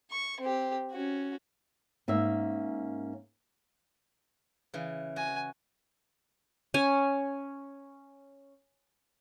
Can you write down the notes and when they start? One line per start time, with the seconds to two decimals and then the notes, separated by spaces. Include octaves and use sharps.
0.11 C#6
0.40 C4 G4
0.92 C#4 F#4
2.08 G#2 A#3 C#4 E5
4.74 C#3 E3
5.16 F#4 G#5
6.74 C#4 G#5